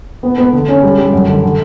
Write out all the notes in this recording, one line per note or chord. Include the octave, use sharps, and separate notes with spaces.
B3
B3
D3
C#4
G3
G3
F#2
D3
D3